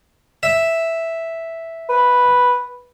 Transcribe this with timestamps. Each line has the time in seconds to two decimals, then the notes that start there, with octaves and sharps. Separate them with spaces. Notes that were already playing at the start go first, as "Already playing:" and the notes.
0.43 E5
1.89 B4